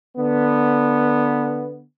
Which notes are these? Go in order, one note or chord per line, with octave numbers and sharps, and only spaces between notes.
D3 B3